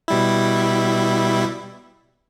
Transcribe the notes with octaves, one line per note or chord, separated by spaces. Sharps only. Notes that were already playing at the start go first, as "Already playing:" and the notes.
B2 G3 E4